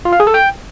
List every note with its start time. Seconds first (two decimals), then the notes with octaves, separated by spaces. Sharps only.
0.05 F4
0.13 F5
0.20 G#4
0.27 A4
0.34 G5